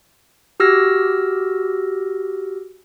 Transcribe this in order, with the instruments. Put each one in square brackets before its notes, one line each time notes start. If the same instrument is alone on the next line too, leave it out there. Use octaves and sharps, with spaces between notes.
[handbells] F#4 G4 E6 F6 A#6